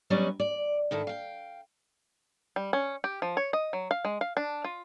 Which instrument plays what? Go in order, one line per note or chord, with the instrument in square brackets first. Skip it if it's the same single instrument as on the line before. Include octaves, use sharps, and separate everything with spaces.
[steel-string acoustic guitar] F#3 G3 B3 C#4 D5 D#5
D5
G#2 D#3 E4 A4
F5 G5
[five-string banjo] G3
C#4
G4
F3
C#5
D#5
F#3
F5
G#3
F5
D4
F4